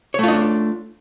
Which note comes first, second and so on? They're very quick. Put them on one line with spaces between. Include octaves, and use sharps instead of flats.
C#5 A3 F4 D#4 D4